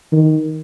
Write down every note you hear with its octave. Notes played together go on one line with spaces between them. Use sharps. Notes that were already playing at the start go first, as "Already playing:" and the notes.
D#3